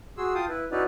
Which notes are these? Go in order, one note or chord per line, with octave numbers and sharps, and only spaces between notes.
F#4 G#4 C6 E6
F4 F5 G5 A5 D#6
E4 B4
C#4 D#4 E4 F#4 B4 D5